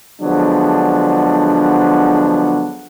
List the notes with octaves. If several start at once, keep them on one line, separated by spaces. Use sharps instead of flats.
D3 F3 F#3 G#3 B3 D4